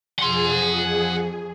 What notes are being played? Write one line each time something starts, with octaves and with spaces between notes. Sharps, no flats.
F2 G#4 F#5 C6